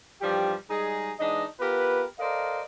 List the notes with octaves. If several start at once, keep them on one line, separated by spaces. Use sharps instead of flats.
G2 E3 F3 G3 G4
G3 G#3 D#4 G#4
E3 G#3 D4 D#4 D#5
B3 F4 G4 A#4 B4
A4 A#4 C5 D5 D#5 F5